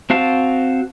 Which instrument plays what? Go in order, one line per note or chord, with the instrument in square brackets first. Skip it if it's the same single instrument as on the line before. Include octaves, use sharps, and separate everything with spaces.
[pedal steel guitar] C4 F#4 F5 A5